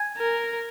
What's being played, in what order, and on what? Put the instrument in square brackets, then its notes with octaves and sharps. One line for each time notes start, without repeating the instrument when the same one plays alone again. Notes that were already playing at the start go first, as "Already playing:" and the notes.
Already playing: [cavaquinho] G#5
[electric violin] A#4